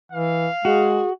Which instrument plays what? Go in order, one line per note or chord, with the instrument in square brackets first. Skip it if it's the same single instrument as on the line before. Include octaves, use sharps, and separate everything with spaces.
[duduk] E3 [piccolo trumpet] F5
[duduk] G#3 [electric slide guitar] F#4 [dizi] G#4